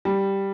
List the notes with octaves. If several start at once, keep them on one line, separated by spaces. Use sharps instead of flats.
G3